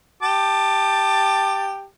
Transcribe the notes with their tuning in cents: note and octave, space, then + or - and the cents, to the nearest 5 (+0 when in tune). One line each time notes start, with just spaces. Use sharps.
G4 +0 A5 +5 D6 +25